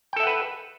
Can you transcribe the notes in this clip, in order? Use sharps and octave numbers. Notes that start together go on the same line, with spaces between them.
A4 B4 E5 F#5 G5